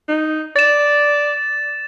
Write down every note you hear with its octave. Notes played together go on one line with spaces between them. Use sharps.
D#4
D5 A6 E7